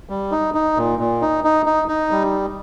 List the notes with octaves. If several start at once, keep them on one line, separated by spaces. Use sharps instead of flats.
G3
D#4
D#4
A#2
A#2
D#4
D#4
D#4
D#4
G3